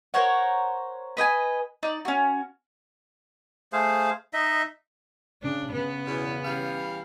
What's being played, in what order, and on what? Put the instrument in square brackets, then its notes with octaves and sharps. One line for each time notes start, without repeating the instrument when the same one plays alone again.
[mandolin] A#4 C5 C#5 F#5
B4 D#5 G5 G#5
D#4 D5
C#4 F#4
[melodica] A3 G#4 C5 F5
D#4 D#5 E5
[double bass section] C#3 [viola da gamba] D4
[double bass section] C#3 [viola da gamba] B3
[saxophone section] E2 B2
E3 G3 F5